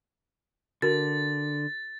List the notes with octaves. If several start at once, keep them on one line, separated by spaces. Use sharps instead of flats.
D3 F#4 A#4 A6